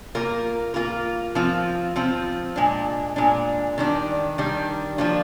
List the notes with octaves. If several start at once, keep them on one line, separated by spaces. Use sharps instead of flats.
A#3 F4 A#4
A#3 F4 A#4
F3 C4 F4
F3 C4 F4
A#2 G#3 D4
A#2 G#3 D4
D#3 G3 D4
D#3 G3 D4
F3 A#3 D4 F4